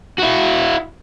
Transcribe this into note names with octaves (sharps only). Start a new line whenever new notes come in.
E4 F#4